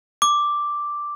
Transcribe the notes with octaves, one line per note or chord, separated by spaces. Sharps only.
D6